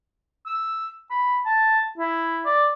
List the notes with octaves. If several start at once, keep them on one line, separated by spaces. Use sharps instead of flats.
E6
B5
A5
E4
D5